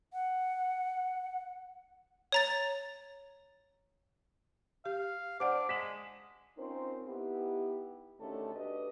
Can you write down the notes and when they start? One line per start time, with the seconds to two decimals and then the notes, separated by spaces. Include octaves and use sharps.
0.13 F#5
2.32 C#5 A#5 A6
4.86 G4 F5
5.40 D4 C5 D5 F#5 D6 F6 D7
5.69 G#3 B6 E7 F#7
6.57 C4 C#4 D#4 F4 A#4 C5
7.07 B3 D#4 E4 G4
8.19 D2 D#3 A3 C#4 G4 A4
8.54 D4 F#4 G4 A4 B4 D#5